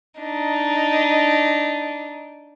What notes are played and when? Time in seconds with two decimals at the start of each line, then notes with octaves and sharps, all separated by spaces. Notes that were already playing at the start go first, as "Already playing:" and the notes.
0.21 D4 D#4